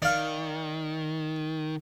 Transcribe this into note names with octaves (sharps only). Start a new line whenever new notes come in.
D#3 D5 F5